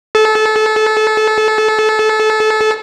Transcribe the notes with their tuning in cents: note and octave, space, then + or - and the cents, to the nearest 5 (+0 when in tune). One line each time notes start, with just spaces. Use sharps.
A4 -25